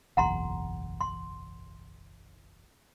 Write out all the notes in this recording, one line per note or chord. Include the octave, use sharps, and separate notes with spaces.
F#1 B1 E2 F#5 A#5 C6
C6